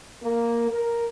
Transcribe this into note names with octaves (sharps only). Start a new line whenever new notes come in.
A#3
A#4